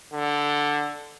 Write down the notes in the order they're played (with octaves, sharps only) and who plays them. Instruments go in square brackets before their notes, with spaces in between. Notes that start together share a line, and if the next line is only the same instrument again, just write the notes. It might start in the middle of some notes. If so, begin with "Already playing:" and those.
[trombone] D3